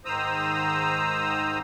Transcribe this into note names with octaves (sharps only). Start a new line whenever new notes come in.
G#2 D#3 C5 A#5 D#6 E6